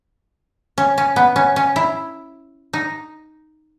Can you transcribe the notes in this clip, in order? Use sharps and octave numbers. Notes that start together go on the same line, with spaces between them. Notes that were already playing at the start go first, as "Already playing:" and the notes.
C#4
C#4
B3
C#4
C#4
E4
D#4